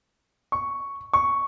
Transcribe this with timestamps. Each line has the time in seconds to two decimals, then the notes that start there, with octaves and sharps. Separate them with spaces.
0.52 C#6
1.13 C#6